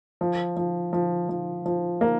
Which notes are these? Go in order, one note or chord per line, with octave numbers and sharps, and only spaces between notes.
F3
F3
F3
F3
F3
A#3